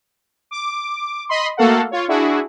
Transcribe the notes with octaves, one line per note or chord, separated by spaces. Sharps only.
D6
D#5 B5 C6
A3 A#3 F#4 A4 F5 F#5
F4 C#5
D4 E4 F#4 G#4